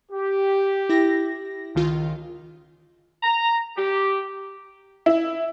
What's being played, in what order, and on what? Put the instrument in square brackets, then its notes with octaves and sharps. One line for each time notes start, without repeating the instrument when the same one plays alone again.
[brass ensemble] G4
[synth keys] E4 A#6
C#2 D#3 F4
[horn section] A#5
G4
[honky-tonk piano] E4